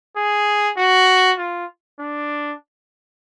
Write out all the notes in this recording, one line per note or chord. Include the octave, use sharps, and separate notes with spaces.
G#4
F#4
F4
D4